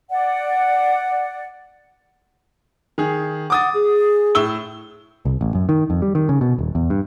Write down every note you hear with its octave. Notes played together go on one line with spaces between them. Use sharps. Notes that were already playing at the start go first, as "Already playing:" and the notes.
D5 F#5
D#3 G#4
F#5 D6 D#6 A6
G#4
A2 E6 G7
C2
A1
F#2
D#3
F2
G3
D#3
C#3
B2
D#1
E2
G2